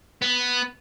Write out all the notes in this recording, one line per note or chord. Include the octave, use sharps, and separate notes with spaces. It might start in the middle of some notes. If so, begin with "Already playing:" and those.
B3